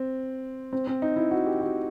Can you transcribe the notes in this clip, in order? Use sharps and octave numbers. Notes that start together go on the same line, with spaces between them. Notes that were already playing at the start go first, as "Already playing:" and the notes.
Already playing: C4
C4
C4
D#4
E4
F#4
G4
F#4